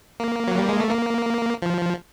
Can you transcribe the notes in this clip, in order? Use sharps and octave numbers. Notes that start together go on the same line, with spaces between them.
A#3
F#3
G3
G#3
A3
A#3
F3